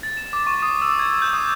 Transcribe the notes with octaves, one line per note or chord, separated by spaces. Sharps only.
A6
E7
D6
C#6
D#6
E6
G#6
G6
D#6